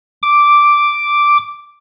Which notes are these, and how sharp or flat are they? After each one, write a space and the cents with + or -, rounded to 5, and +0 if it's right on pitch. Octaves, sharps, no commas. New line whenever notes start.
D6 +0